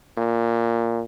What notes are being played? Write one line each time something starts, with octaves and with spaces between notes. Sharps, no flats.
A#2